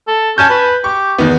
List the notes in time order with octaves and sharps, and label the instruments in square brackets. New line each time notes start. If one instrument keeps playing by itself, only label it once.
[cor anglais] A4
[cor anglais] C#4 [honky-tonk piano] G#5 A5 G6
[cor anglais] B4
[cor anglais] G4 [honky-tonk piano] C#6
[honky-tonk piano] E2 D#3 B3